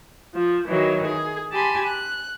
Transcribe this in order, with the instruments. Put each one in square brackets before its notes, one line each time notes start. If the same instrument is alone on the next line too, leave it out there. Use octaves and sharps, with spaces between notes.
[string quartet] F3
D#3 E3 F#3
G#4
G4 G#5 A5 B5 C6
F#6